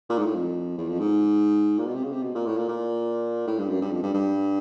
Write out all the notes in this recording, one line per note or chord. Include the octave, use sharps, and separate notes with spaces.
A#2
G#2
A2
F2
E2
F2
G#2
A#2
B2
C3
C#3
C3
B2
A#2
A2
A#2
A#2
A2
G2
F#2
G2
F2
G2
G2